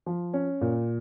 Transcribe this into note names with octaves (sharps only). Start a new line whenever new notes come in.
F3
C#4
A#2